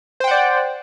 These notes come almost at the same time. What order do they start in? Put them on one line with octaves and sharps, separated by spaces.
C5 G5 F#5 D5